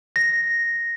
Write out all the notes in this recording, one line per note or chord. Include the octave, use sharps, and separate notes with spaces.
A#6